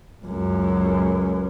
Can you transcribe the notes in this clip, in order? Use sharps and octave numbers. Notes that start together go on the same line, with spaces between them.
C#2 F#2